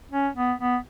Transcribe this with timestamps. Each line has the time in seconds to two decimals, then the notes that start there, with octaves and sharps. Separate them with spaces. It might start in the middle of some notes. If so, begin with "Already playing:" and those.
0.11 C#4
0.36 B3
0.60 B3